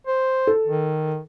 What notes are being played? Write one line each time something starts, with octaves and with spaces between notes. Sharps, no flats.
C5
A4
D#3